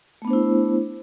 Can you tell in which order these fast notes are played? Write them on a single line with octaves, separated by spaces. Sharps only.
A3 B3 D4 C5 E4